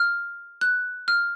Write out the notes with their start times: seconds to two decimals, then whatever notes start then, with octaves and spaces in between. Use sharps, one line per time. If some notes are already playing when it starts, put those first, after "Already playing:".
Already playing: F6
0.61 F#6
1.08 F6